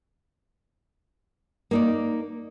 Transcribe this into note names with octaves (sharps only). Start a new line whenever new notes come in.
A#3 D#4 D5